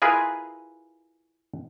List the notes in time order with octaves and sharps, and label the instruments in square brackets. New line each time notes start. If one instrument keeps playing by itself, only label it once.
[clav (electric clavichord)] E4 F4 G#4 A#4 B4